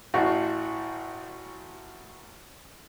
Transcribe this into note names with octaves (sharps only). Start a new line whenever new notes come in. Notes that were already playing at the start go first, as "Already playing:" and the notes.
A1 A2 F#4 F5